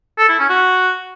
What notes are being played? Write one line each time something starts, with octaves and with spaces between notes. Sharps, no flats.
A4
E4
C#4
F#4